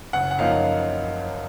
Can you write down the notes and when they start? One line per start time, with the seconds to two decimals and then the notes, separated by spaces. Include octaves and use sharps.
0.13 F#1 F#5
0.31 F#5
0.39 F#2 F3 A#3 D#4 F5